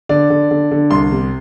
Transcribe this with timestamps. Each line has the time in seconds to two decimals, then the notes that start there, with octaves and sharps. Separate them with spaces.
0.09 D3 D5
0.30 D3
0.51 D3
0.71 D3
0.91 C2 C6
1.11 C3